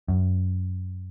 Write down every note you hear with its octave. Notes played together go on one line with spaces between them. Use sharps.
F#2